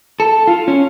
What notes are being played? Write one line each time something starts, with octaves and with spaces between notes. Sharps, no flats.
A4
F4
C#4